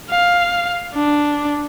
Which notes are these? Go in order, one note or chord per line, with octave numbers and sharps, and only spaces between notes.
F5
D4